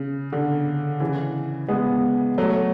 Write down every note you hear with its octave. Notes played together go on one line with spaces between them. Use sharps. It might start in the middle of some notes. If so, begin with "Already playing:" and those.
Already playing: C#3
D3
C#3 E3
G#3 B3
F#3 A3